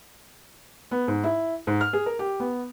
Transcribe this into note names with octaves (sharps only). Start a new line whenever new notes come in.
B3
G#2
E4
G#2
F6
G#4
A#4
G4
B3